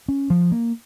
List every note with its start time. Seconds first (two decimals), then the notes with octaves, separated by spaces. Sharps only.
0.08 C#4
0.30 F3
0.52 A#3